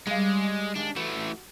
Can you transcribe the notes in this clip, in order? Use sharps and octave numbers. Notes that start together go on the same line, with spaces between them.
G3 G#3 F5
D#2 G#3 D4
E3 A3 F#4